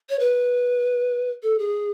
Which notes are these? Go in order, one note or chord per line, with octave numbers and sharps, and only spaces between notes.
C#5
B4
A4
G#4